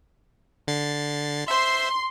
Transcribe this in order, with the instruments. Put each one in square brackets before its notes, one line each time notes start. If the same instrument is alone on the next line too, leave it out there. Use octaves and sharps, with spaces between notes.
[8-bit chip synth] D3 A6 C7
[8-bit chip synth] C5 E5 [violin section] C6